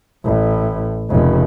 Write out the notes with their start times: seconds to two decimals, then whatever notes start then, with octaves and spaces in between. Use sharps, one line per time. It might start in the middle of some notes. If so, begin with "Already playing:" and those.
0.24 A1 A2
1.10 F1 C#3